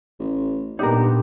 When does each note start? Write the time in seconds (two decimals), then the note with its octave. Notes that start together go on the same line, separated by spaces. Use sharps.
0.20 A1
0.79 G2 A#2 B3 D4 D#4 G4 A#4 C6